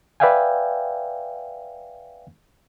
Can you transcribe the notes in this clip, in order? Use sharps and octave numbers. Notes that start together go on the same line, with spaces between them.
B4 D5 E5 F5 G5 G#5